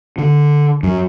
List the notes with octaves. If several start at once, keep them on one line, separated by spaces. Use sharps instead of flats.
D3
F#2